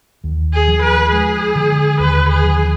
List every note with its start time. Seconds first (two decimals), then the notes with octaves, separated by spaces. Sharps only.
0.24 D#2
0.53 G#4
0.68 F3
0.82 B4
1.11 G#3 G#4
1.55 D3
1.99 D#2 B4
2.29 G#4
2.44 F3